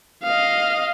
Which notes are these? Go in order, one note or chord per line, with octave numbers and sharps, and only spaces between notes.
D#5 F5